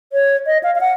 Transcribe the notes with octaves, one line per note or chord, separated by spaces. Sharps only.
C#5
D#5
F5
F5
F#5